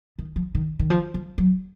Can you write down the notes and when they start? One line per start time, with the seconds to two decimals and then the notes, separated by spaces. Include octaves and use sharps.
0.18 D#3
0.36 F3
0.55 D#3
0.79 D#3
0.90 F3
1.14 F3
1.38 F#3